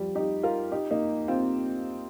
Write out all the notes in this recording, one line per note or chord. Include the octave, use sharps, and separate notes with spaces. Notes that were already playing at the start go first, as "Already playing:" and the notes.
Already playing: F3 G3
D#4 G4
F4 A#4
D#4 G4
A#3 D#4
C4 F4